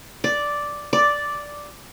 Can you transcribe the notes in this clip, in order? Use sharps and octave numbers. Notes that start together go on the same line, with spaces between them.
D5
D5